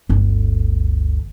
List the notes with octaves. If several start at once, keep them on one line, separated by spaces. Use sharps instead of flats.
G1 D2